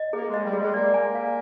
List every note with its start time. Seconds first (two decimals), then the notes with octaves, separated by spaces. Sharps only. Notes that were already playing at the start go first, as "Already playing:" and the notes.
Already playing: D#5
0.13 A#3 G#4
0.28 G#3
0.34 D#5
0.44 G3
0.53 G#4
0.59 G#3
0.74 A#3 D5
0.94 G#5
1.15 F5